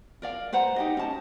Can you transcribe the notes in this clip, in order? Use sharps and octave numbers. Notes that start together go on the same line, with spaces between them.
A#4 D5 F5
B4 C5 F#5 A#5
D#4 G4 D#5
C#4 A5